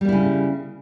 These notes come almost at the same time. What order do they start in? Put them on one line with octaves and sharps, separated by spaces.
G3 A#3 E4 C#3